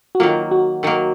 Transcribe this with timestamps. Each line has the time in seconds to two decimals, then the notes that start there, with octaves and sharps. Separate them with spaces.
0.15 F#4
0.20 D#3 F#3 A#3 F4
0.51 F#4
0.83 D#3 F#3 A#3